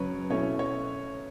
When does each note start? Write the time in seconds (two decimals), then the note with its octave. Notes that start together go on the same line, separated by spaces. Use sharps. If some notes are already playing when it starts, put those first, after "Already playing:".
Already playing: F#2 C#3 F#3 C#4 B4 C#5
0.30 B2 A3 C#4 E4 C#5
0.59 C#5